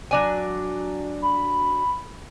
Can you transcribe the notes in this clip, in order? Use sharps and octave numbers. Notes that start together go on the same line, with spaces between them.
F#3 D4 G#5
B5